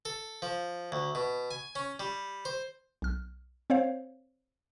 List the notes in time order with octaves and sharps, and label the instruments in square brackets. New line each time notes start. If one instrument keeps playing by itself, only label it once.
[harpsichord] A4
F3
D2
B2
G#5
C#4
G3
C5
[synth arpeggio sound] B1 F6
C4 C5 C#5 F5